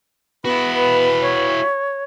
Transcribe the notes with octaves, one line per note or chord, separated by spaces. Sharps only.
B3 E4 F#4 B4
C#5